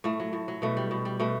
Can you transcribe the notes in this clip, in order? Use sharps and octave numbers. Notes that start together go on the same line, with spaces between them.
A2 A3
F#3
A2
F#3
B2 A3
G3
B2
G3
B2 A3